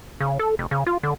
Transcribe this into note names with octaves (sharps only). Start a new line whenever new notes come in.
C#3
A4
F1
C#3
F4
D3